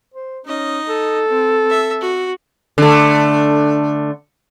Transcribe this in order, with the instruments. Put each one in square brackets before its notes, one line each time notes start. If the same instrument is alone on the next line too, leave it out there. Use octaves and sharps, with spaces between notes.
[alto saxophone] C5
[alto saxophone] C#4 [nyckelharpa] D#4 D#5
[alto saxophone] A4
[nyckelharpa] C4
E5
F#4
[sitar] D3 A3